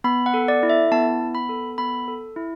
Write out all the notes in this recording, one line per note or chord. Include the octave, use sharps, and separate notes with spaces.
B3 B5
F#5
A4
D5
E4
E5
B3 A5
B3
B5
A4
B3 B5
A4
E4